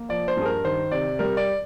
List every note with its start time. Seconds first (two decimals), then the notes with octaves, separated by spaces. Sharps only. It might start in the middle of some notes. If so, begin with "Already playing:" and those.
Already playing: A#3
0.09 F3 D5
0.28 C5
0.37 G2 G#4
0.45 A#4
0.64 D#3 C5
0.91 C3 D5
1.19 G3 A#4
1.37 D5